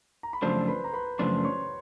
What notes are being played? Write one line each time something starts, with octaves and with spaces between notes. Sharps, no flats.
A#5
B5
F#2 C#3 F3 A3 D4 C5 C6
B4 B5
A#5
B4 B5
F#2 C#3 F3 A3 D4 C5 C6
C#5 C#6